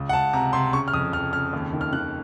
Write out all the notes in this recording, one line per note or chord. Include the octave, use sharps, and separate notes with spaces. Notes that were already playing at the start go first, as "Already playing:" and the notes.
Already playing: C#2
F#5
C#2 A5
C3 A#5
C3 C6
C#3 C#6
F6
F2 D#6
F2 F6
C#3 F6
D#2
D#3
F6
D#3 F#6